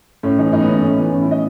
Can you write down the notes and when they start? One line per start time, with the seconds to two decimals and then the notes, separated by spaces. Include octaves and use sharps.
0.23 A2 C#4
0.38 E3 D#4
0.53 A2 D#4
0.61 B3
0.67 E3 C#4
0.82 A2 C#4
0.98 E3 B3
1.12 A2 C#4
1.22 E4
1.27 E3 D#5